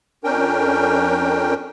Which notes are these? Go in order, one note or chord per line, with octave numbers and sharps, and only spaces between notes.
F2 C#4 D4 A#4 G5